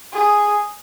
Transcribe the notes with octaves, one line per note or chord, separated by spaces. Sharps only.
G#4